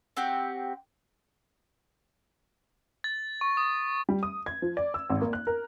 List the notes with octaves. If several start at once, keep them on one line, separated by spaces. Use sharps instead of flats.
C4 F#4 G4
A6
C#6
D#6
G3
D#6
G#6
F3
D5
E6
G#1
A#3
F#6
A#4